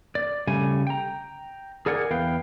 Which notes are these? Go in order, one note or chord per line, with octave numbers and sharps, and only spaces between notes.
D5
C#3 G3 A3 G#5
G5 A#5
G#4 A#4 D5 F#5 G#5
E2 B4 F5 G5